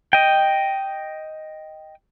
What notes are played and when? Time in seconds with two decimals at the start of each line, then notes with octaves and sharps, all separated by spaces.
0.13 D#5 G5